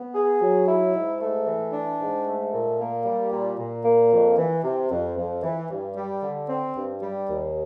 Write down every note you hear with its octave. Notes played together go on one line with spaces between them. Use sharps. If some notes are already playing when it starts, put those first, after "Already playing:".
Already playing: B3
G#4
F#3
E4
G#2
A3
E3
D4
G#2
A3
A#2
A#3
G3
A#2
A#2
A#3
F2
E3
C3
F2
F2
E3
G2
G3
D3
C4
G2
G3
D#2